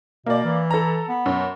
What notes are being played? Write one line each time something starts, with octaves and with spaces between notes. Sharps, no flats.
B2 A#3 D5
E3
A4 A#5
B3
F#2